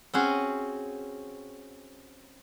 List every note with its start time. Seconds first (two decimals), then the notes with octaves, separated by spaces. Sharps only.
0.14 C4 C#4 F#4 G#4